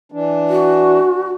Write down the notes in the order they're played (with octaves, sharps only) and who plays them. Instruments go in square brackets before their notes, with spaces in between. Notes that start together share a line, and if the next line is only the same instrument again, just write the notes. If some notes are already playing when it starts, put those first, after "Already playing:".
[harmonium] E3 D4
[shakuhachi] F#4